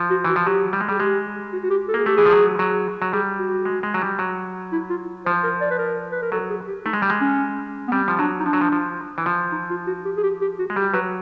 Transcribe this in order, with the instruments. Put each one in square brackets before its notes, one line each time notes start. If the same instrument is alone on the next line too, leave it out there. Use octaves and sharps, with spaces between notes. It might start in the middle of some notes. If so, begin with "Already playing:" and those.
Already playing: [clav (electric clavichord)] F3
[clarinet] F#4
[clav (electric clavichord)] E3 [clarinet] F#4
[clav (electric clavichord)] F3
[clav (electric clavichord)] F#3 [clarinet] G4
[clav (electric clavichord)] G3
G#3
[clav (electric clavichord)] G3 [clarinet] G#4
[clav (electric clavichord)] G#3 [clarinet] G4
[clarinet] F#4
F#4
G4
A4
[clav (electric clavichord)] A#3 [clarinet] G#4
[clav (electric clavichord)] A3 [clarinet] G4
[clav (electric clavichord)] E3 [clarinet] G#4
[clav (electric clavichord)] F3
F#3
F#3
F#3
[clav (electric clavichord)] G3 [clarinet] G#4
[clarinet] F#4
[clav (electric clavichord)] G#3
G#3
F#3
G3
F#3
[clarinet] E4
F4
[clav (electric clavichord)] F3 [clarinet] C5
[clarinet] A#4
D5
B4
A#4
B4
A#4
[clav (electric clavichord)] F#3 [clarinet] A4
[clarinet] G#4
G4
[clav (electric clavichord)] A3 [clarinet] D#4
[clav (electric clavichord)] G#3
G3
G#3
[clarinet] C#4
B3
[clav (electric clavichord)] G3 [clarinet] C4
[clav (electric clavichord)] F3
[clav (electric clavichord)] F#3 [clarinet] D4
[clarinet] D#4
[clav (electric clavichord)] F3 [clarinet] D4
[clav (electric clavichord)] F#3
F3
F3
E3
F3
[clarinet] D#4
F4
F#4
G4
G#4
G4
G4
F#4
[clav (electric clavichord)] G#3
[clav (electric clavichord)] G3 [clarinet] G4
[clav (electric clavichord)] F#3 [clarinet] B4